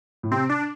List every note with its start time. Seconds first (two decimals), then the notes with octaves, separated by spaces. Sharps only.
0.23 A2
0.32 C3 C4
0.49 D4